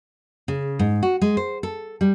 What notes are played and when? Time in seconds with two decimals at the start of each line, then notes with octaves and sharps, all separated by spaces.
0.48 C#3
0.79 G#2
1.03 F#4
1.21 G#3
1.37 C5
1.63 A4
2.01 G3